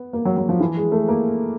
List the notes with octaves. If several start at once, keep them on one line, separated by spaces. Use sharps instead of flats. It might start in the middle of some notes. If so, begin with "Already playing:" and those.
Already playing: B3
A#3
F#3
F#3
F3
E3
G#3
A3
A#3